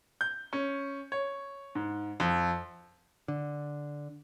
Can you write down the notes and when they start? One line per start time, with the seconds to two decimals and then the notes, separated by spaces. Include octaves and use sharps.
0.21 G6
0.53 C#4
1.12 C#5
1.75 G#2
2.20 F2
3.28 D3